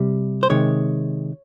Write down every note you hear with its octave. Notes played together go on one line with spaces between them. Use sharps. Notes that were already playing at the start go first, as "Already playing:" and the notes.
Already playing: C3 G3
C5
C3 D#3 G#3 C#5